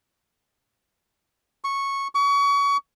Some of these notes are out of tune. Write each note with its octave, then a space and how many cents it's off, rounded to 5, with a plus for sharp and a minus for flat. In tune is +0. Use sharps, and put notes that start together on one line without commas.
C#6 -10
C#6 +30